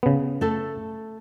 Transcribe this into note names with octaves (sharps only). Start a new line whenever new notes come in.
C#3 B3
A3 A4